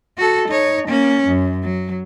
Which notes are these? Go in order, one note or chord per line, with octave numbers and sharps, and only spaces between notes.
F#4 A4
D#4 C#5
A#3 C#4
F#2
F#3